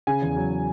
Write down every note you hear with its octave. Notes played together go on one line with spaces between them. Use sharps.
C#3 G#5
E2
F#3